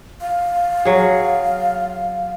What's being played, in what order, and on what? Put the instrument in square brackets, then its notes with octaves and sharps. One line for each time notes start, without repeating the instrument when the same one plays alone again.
[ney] F5
[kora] F#3 G#4